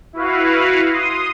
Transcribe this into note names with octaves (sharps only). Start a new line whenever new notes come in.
E4 F#4 B4 F5
C6 D#6